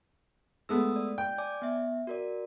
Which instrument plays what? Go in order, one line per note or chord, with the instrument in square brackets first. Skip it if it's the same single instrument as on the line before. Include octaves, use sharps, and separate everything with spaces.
[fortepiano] G#3 A3 B3 [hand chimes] D#6 E6
[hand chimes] D5
[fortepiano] G5 [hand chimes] G6
[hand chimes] D5 G#5 D6
B3 E5
F#4 A#4 D5